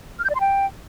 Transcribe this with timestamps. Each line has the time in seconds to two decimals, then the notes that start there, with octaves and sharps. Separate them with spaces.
0.19 F6
0.24 G6
0.30 D5
0.35 C6
0.40 G5